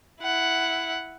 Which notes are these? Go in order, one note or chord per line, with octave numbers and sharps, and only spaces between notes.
E4 F#5